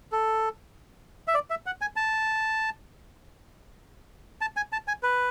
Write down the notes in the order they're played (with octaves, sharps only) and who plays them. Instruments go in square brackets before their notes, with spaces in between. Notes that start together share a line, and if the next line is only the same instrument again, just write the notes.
[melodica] A4
E5
D5
E5
F#5
G#5
A5
A5
G#5
A5
G#5
B4